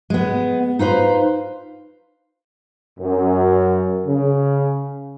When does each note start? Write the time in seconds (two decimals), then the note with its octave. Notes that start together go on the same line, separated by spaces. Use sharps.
0.10 G#3 B3
0.79 D#4 F4 B4 C5
3.00 F#2
4.06 C#3